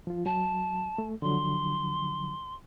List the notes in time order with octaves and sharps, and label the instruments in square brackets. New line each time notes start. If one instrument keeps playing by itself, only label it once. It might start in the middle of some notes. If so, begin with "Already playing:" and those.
[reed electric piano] F3 F4
[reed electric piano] F#3 [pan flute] A5
[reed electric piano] A3
[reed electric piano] D3 F3 F#3 [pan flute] C6